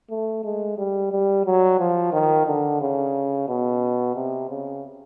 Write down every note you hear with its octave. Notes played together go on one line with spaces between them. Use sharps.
A3
G#3
G3
G3
F#3
F3
D#3
D3
C#3
B2
C3
C#3